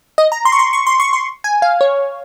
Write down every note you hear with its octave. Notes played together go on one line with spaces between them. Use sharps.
D#5
A#5
C6
C#6
C6
C#6
C6
C#6
C6
G#5
F5
C#5